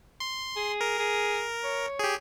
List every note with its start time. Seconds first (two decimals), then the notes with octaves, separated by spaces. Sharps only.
0.20 C6
0.56 G#4
0.81 A#4
0.99 G#4
1.64 C#5
1.99 G4 G#4